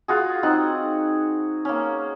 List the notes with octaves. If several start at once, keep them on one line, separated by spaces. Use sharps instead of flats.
F4 F#4 G#4
C4 D#4 F#5
A#3 C#4